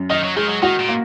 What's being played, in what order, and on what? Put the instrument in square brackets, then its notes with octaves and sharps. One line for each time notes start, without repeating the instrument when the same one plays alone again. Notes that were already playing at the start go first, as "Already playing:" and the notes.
Already playing: [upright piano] F#2
[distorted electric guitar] D#3 [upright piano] D#5
[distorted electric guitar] F#3
[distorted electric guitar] D#3 [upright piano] G#3
[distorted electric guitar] F#3
[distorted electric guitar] D#3 [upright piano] F#4
[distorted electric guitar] A#2
[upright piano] A#3